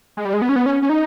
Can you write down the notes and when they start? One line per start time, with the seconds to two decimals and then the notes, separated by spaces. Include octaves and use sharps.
0.17 G#3
0.25 G3
0.33 G#3
0.42 B3
0.49 C#4
0.56 B3
0.66 C#4
0.82 C#4
0.89 D#4